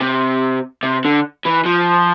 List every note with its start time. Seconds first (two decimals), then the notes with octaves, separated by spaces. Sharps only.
0.01 C3
0.83 C3
1.05 D3
1.45 E3
1.65 F3